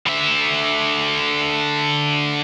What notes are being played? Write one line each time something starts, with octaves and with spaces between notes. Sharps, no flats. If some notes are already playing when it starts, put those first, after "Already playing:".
D3 E5